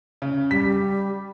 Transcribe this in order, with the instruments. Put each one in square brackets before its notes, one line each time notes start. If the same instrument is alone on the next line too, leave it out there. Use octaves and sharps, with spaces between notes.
[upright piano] C#3
[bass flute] G3 [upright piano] B6